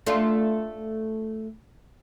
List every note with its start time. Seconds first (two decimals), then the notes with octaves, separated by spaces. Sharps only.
0.06 A3 D4 F4